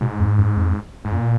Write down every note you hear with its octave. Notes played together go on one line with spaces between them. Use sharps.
G#2 B2
F2
F#2
F2
G#2
F#2 A#2